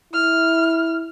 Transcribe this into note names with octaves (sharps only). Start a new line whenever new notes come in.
E4 F6